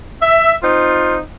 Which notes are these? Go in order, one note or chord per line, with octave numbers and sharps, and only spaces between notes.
E5
C4 D#4 F4